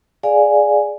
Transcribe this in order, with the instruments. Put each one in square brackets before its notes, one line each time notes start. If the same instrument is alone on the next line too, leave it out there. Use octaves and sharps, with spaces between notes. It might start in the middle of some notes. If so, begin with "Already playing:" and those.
[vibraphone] G#4 D5 F5 G#5